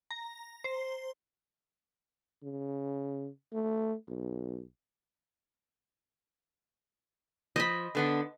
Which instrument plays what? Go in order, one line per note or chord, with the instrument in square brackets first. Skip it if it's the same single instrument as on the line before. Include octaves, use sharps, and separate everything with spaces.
[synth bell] A#5
C5
[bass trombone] C#3
A3
B1
[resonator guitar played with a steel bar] F3 [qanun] D#5 B5
[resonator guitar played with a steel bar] D3 B3 D4